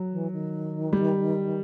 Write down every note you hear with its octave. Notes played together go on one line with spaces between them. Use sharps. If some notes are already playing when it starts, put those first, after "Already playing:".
Already playing: F#3
E3
D#3
G3